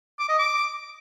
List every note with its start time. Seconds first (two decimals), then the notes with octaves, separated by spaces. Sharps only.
0.19 D6
0.29 D#5
0.38 D6